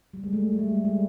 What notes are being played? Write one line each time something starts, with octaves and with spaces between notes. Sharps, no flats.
G3
G#3
A3
G#3
G3
G#3
G3